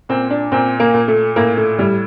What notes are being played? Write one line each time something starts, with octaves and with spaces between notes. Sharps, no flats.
A#2 C4
D4
A#2 C4
A#3
A#2
A3
A2 A#3
A3
A2 G3